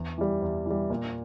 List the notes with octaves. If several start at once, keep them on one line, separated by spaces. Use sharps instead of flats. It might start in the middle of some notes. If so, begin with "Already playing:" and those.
Already playing: E2
E3 G3
E2
E3 G3
A#2